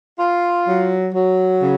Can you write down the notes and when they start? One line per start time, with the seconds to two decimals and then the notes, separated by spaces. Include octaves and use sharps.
0.19 F4
0.67 F#3
1.14 F#3
1.61 C#3